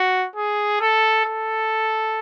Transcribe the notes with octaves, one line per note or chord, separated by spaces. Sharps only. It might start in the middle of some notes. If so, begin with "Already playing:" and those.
Already playing: F#4
G#4
A4
A4